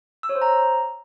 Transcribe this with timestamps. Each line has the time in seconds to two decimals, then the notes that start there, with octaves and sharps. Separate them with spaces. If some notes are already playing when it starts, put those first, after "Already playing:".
0.23 E6
0.29 C#5
0.35 C5
0.42 A#5